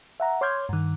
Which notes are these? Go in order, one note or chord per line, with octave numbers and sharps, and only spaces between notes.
E5 F#5 A#5
C#5 C6 D6 F6 G6 G#6
G2 D#3